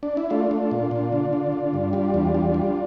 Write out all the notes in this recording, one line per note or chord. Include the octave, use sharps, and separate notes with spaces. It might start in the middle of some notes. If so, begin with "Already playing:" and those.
D4
E4
A3 D4 F4
A3
A#2
A#2
D3
D3
D3
G2
G3 D4 F4
E2
G3
G3